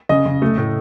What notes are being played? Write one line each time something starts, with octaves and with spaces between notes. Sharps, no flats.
C#3 D#5
C#3
A3
A2